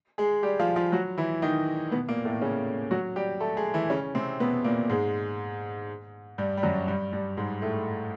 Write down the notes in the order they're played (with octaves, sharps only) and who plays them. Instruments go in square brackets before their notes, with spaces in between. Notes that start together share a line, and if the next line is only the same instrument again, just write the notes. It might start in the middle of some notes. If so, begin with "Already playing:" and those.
[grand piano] G#3 G#4
G3 G4
F3 F4
F3 F4
F#3 F#4
E3 E4
D#3 D#4
B2 B3
A#2 A#3
A2 A3
C#3 C#4
F#3 F#4
G3 G4
A3 A4
G#3 G#4
E3 E4
C#3 C#4
C3 C4
B2 B3
A#2 A#3
G#2 G#3
G2 G3
G3
F#2 F#3
G2 G3
G2 G3
G#2 G#3
A2 A3